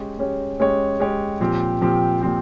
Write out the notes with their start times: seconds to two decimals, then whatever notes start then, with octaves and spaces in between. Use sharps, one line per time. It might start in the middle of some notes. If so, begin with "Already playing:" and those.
Already playing: G#3 C#4 G4 C#5
0.19 G#3 C#4 G4 C#5
0.60 G#3 C#4 G4 C#5
1.00 G#3 C#4 G4 C#5
1.40 A#2 F3 C4 G4
1.81 A#2 F3 C4 G4
2.21 A#2 F3 C4 G4